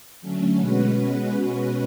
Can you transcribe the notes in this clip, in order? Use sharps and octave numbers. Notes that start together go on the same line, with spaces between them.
D3 F#3 A3 C#4
B2 G#3 C#4 F#4 B4